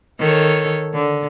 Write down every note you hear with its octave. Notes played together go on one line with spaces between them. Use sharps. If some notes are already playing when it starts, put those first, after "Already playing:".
D#3 A4 C#5
D3